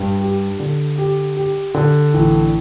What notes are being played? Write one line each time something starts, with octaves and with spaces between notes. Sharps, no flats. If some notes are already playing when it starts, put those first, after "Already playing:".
Already playing: G2
G4
D3
G4
G4
D3
A1